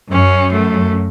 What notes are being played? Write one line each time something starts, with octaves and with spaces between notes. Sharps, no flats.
F#2 C#4
A3